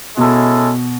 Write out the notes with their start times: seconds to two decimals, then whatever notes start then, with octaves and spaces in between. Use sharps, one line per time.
0.17 B2 G#3 C#4 E4 A4